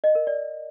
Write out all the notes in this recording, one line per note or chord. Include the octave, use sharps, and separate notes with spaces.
D#5
A#4
D5